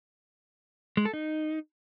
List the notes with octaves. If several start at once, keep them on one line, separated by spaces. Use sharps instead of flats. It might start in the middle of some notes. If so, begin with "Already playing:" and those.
G#3
A4
D#4